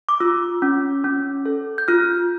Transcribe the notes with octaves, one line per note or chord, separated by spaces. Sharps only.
D6
F4 E6
C#4
C#4
A4
G6
F4 F6